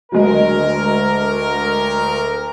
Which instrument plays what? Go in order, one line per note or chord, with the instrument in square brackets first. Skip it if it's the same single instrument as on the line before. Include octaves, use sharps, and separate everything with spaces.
[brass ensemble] D2 A#4 [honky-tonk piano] F#3 G#3